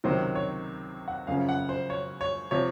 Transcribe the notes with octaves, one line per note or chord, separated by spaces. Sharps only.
C#2 C3 D#3 F#3 C5
C#5
F#5
F#2 C#3 F3 F5
F#5
C5
C#5
C#5
C3 F3 C#5